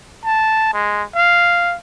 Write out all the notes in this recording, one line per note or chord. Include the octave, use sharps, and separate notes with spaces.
A5
G#3
F5